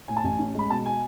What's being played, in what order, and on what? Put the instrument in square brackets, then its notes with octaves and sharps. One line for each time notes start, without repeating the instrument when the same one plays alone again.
[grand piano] A2 G#5
A5
A1 G#5
C#4
G#3 B5
B2 A5
G#5